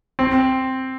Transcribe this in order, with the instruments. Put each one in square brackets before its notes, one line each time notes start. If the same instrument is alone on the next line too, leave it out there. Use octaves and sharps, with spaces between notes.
[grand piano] C4